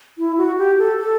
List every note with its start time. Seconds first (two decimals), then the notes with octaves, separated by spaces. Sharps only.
0.18 E4
0.38 F#4
0.58 G4
0.78 A4
0.98 A4